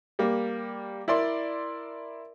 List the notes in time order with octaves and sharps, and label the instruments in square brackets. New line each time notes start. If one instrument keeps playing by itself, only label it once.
[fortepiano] G3 A#3
E4 A#4 D5 C6